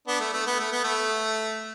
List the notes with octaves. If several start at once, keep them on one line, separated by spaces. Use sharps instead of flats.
B3 D4
A3
A3
B3
A3
B3
A3